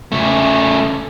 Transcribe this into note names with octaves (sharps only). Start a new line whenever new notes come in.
C#3 A3